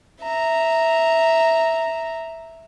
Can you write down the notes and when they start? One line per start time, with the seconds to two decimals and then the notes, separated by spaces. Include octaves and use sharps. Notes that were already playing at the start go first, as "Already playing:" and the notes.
0.22 E5 A#5